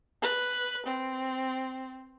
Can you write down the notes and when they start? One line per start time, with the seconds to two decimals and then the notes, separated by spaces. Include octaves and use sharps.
0.22 B4
0.87 C4